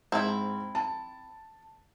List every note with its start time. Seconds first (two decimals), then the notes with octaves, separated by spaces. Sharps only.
0.12 G#2 C4 E4
0.75 A5